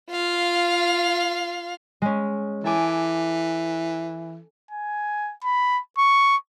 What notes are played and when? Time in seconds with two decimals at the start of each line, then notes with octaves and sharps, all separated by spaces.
0.11 F4 F5
2.02 G#3 C#4
2.64 E3 A4 G#5 D6
4.71 G#5
5.44 B5
5.98 C#6